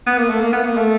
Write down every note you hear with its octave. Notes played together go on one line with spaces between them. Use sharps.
B3
A#3
A3
A#3
B3
A#3
A3